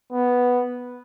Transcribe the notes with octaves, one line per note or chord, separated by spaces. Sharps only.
B3